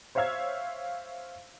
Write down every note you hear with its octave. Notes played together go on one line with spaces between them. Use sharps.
C5 C#5 E5 F5 E6 G#6